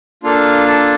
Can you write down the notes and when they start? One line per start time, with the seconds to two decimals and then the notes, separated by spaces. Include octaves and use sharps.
0.23 A#3 D4 F4 A4 F5
0.68 A4 A5